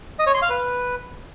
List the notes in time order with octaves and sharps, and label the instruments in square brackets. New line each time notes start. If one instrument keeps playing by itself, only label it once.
[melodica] D#5
C#5
C6
F5
B4